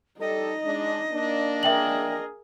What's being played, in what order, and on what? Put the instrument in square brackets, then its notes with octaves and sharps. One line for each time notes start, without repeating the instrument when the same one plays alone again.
[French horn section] G3 A4 [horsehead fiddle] D#4 [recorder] D#5
[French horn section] G#3 D4
A#3 D4
[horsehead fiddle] G#4 A#4 [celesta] E5 G5 F#7